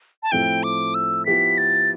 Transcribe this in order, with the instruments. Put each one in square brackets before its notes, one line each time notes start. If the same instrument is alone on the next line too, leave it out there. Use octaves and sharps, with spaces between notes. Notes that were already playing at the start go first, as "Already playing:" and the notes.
[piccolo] A5
[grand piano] A2 F3 A3 C4 E4 [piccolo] G5
[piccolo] D6
E6
[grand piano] F3 B3 E4 G4 B4 [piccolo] B6
[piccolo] A6